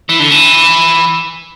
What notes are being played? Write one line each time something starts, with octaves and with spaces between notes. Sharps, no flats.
E3
D3
E3